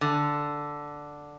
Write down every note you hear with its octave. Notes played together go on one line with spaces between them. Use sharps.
D3